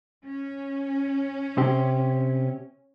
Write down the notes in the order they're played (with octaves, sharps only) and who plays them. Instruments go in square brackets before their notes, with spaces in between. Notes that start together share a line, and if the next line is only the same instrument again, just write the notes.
[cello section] C#4
[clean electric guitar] C3 C4 G4